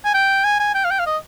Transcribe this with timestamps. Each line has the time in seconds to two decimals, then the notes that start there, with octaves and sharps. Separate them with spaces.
0.05 G#5
0.14 G5
0.44 G#5
0.60 G#5
0.75 G5
0.85 F5
0.91 G5
0.99 F5
1.06 D#5